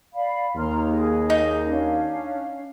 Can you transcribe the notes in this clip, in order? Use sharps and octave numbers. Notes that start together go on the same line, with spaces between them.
D5 F5 B5
D#2 A#5 C6 F6
G#4 D#5
D#4
C#4 D4 F5